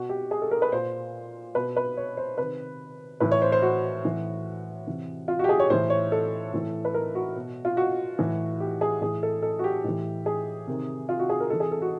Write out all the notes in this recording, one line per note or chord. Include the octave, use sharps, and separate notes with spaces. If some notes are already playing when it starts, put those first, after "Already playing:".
Already playing: B2 F#4
G4
G#4
A4
A#4
B4
A#2 C5
B2 B4
B4
C#5
C5
C3 D#3 B4
A2 E3 B4
C#5
C5
C5
F#4
A2 E3
C3 E3
F4
F#4 G4
G#4
C#5
A2 E3 C5
C#5
A4
A2 E3
B4
A#4
F#4
B2
F4
F#4
A2 E3
G4
G#4
A2 E3 G#4
A4
A4
F#4
G4
A2 E3
G#4
C3 D#3
F4
F#4
G#4
A#4
C3 E3 A4
G#4
A4
F#4